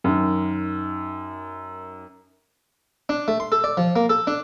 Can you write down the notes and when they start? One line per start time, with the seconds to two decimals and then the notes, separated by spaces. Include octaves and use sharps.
0.04 F#2 D#3
3.09 D4
3.28 A3
3.40 C6
3.52 A4
3.64 D5
3.77 F3
3.96 A#3
4.09 A4
4.27 D4